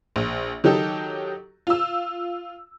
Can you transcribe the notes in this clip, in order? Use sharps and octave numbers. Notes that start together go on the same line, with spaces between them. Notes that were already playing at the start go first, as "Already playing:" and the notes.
A#1
D#3 F#3 D#4 G4 A4
F4 E6